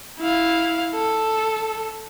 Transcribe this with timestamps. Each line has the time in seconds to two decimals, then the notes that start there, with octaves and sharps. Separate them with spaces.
0.19 E4 F5
0.95 A4